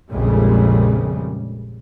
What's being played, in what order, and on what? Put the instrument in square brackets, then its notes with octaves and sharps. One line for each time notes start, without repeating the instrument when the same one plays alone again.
[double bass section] A#1 F2 C#3 G3 G#3